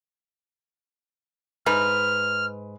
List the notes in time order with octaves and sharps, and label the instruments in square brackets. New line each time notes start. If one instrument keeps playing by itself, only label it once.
[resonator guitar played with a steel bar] G#2 B4 [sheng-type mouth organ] F6